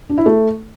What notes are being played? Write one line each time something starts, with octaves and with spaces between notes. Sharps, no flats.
D4
E4
A3